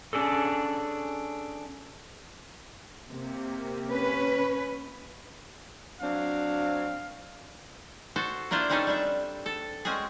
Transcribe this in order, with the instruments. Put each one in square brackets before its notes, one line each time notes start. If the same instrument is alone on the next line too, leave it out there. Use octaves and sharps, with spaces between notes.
[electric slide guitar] C#4 D4 G#4 A4
[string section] C3 A#3
[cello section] C#4 B4
[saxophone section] F#3 C4 D4 [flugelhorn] F5
[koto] F#4 A4 C5
A#3 D4 E4 F4 C5
G3 C4 C#4 D#4 G#4 A4
G3 D4 E5
A4
G#3 C4 C#4 F#4 G#4